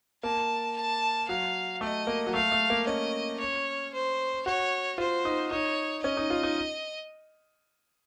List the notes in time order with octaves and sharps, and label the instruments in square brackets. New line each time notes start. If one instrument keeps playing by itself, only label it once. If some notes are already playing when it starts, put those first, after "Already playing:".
[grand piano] A#3 [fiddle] A5
[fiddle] A5
[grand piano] F#3 [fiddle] F5
[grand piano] A3 [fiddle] D#5
[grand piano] A#3
F#3
[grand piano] A3 [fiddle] F5
[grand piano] A3
A#3
[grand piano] C#4 [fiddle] D#5
[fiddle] C#5
C5
[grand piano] F#4 [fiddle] C#5
[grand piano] F4 [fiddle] C5
[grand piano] D#4
[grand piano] D#4 [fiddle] C#5
[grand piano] C#4 [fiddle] D#5
[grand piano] D#4
F4
D#4